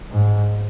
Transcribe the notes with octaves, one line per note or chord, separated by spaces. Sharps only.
G#2